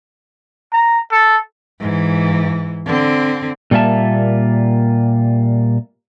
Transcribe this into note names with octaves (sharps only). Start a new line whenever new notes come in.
A#5
A4
G#2 E3
D3 C4
A#2 G3 A#3 F4 E5 A5